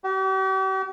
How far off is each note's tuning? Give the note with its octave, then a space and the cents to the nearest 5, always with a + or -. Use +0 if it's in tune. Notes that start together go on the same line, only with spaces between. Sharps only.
G4 -45